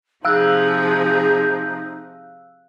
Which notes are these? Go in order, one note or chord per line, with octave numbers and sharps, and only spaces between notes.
C3 F3 D#4 G#4 F5 E6 F#6